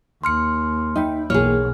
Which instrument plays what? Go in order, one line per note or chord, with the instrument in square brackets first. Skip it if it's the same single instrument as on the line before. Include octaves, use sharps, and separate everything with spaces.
[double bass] D#2 [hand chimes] C6 F6 C#7
[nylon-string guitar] D#4 [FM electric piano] E5 G5 B5
[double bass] B1 [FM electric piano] E3 A#3 [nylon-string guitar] G#4 C#5 [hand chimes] F6